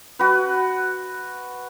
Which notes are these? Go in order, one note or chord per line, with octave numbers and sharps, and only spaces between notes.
F#4 B4